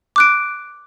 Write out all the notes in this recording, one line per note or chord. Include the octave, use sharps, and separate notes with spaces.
D6 F#6 D7